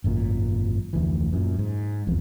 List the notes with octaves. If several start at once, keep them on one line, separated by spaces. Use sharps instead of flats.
G#1 F#2 A#2
F1 D2 E3
F#2 A#2
G#2
E1 B1 F2